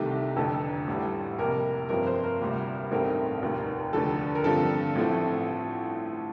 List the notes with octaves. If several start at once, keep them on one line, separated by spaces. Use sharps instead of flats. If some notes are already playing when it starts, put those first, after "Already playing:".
Already playing: C2 C3 D#3 A3 G4
F1 F2 D3 A4
A1 A2 G3
F2 C3 G3 A#3 A#4
G1 G2 F3 C4 A#4
C5
A#4
D2 C3 G3 A#3
A1 G2 D#3 A3 C4 A#4
F1 D#2 D#3
F1 D#2 D3 F3 A4
A#4
G2 D3 F3 C4 A4
A1 A2 F3 A3 C4